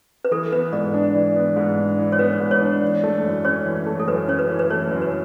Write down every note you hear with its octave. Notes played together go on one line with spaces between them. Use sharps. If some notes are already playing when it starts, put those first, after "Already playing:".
B4
E3 A4
B3 B4
G#2 D5
D4
E3
B3
G#2
D4
E3
C#5
B3 B4
G#2
C#5
D4
E3
A3
F#2
C#4 C#5
E3
A3
A4
F#2 B4
C#4 C#5
B4
E3
B4
A3 C#5
F#2
B4